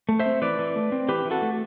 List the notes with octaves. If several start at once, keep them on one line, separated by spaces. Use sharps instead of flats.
A3
C5 E5
C4
E3 B4 D5
E3
A3
C4
E3 G4 B4
E3
F#4 A4
A3